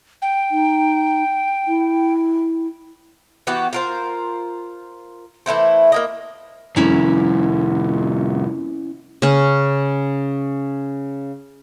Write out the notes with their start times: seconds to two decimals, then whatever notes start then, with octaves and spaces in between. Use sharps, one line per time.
0.22 G5
0.51 D#4
1.68 E4
3.47 E3 B3 F#4 G4
3.73 F4 A#4 C5
5.46 E3 A3 E4 C5
5.92 A#3 E4 D#5
6.76 C2 F2 C#4 E4 A#5
9.22 C#3 C#4